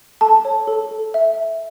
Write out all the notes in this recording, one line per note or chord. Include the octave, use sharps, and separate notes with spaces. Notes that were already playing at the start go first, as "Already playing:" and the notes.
A4 A5
C#5
A4
A4
E5